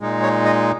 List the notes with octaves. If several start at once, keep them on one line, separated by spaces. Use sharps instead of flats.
A#2 G#3 D#4
C#5
D#5